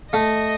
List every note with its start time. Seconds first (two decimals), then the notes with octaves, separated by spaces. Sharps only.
0.12 A3 D#5